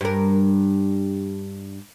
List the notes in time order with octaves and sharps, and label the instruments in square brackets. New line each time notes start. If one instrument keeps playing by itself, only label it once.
[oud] G2 A#4